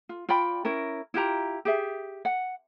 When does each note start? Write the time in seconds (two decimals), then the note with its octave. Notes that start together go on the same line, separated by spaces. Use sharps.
0.09 F4
0.29 F4 D5 G5 B5
0.65 C#4 E4 A#4
1.14 E4 F4 G4 A#5
1.65 G4 G#4 E5
2.25 F#5